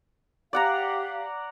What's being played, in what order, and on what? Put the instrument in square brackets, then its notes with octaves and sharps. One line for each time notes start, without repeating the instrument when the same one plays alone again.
[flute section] G4 F5 [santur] D5 F#5 A#5